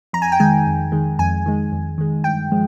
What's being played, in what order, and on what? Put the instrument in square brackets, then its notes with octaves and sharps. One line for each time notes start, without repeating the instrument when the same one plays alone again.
[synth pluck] F2 A#5
G#5
G5
D#3 G#3 G#5
F2
D#3 G#3
F2 G#5
D#3 G#3
F2
D#3 G#3
G2 G5
F3 G#3